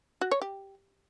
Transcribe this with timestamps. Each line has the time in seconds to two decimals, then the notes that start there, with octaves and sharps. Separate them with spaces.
0.21 F#4
0.31 C#5
0.42 G4